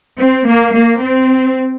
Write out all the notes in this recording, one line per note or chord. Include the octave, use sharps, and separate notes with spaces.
C4
A#3
A#3
C4